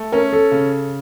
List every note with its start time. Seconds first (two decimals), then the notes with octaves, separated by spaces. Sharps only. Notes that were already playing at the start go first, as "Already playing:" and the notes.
Already playing: A3
0.12 C#4 A#4
0.32 A4
0.52 C#3